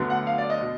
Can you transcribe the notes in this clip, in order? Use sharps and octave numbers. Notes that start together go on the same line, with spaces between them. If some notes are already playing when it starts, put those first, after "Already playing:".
Already playing: D2 D3 F#3 B3
F#5
F5
D5
D#5
B2